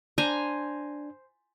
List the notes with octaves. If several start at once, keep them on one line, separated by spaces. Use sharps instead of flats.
D4 C5 G#5 A#5